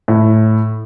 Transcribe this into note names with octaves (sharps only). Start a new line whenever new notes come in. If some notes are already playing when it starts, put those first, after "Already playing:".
A2